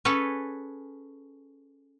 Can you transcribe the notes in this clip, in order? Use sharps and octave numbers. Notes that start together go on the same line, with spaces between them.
C#4 G#4 A4 B4